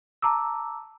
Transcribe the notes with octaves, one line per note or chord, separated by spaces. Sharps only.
A5 A#5 D6 E6